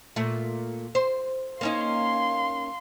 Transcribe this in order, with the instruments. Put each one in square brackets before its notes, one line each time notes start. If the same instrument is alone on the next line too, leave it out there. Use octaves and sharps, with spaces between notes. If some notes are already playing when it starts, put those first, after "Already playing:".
[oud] A#2 A3
C5
[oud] A#3 C#4 D#4 [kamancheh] F5 C6